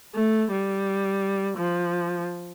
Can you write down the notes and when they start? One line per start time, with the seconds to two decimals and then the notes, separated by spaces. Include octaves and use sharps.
0.15 A3
0.52 G3
1.57 F3